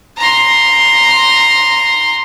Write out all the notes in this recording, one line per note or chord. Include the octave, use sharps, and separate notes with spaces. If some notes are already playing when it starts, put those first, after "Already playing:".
A#5 C6